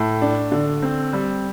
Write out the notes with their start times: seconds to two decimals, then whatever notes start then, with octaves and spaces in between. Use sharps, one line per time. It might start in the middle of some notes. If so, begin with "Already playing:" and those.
Already playing: A2 A3
0.22 D4
0.52 D3
0.82 C4
1.13 G3